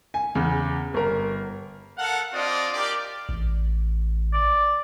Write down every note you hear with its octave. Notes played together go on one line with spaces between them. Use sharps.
G#5
E2 C#3
G1 A#4
A4 A#4 F5 F#5
C4 D4 F4 D5 D#5
G4 A#4 D5
A1
D5